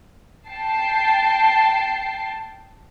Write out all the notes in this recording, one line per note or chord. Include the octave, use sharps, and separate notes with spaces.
G5 A5 C7